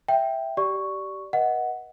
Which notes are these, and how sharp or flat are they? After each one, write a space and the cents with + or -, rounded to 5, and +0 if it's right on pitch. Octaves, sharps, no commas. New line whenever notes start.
E5 +0 G5 +0
G4 -20 D5 +0 C#6 +0
B4 -40 D#5 +15 F#5 +0